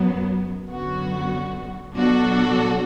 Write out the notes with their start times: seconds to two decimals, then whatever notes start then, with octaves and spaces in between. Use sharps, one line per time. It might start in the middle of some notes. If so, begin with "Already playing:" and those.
Already playing: F#2 F#3 B3
0.69 F#2 D3 F#3 B3 F#4
1.95 B2 F#3 D4 F#4 A4